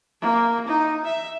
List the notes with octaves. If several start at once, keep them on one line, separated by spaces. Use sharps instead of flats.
A#3
D#4
E5